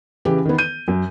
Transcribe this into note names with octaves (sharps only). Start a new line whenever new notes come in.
C#3 E3 G4
D#3 B3
G6 D#7
F#2